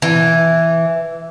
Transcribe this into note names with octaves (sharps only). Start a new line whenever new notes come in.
E3